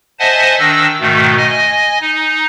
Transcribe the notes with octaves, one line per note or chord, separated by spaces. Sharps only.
C5 D#5 E5 F#5 G#5 A5
D#3 D4 E6 A#6
G#2 B2 D#3 A3
D#5 G#5
D#4